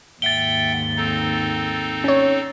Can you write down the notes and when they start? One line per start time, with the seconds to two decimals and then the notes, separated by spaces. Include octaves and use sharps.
0.22 D#2 G#2 E5 F#5 G5 A6 G7
0.97 C4 D#4 A4
2.04 C#4 C#5